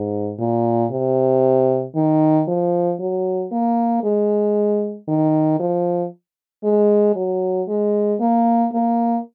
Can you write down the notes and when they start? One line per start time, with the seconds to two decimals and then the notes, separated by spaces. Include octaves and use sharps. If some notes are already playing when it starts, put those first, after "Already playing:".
Already playing: G#2
0.39 A#2
0.91 C3
1.95 D#3
2.47 F3
2.99 F#3
3.52 A#3
4.03 G#3
5.08 D#3
5.60 F3
6.64 G#3
7.15 F#3
7.68 G#3
8.20 A#3
8.72 A#3